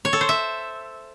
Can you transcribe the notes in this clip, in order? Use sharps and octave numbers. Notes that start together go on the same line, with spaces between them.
C#5
A4
C5
E5